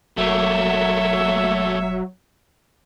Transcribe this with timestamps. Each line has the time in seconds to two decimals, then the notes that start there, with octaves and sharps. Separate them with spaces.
0.17 E1 F#3 A3 A#3 C#5 E5